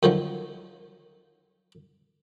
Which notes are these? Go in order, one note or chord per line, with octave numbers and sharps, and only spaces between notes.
F#2 D3 D#3 F3 F#3